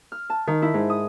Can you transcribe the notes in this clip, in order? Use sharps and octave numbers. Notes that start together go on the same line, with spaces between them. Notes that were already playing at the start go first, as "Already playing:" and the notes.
F6
A5
D#3
E4
G#2
D#6